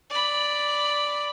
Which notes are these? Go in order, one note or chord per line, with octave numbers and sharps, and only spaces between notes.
D5 B5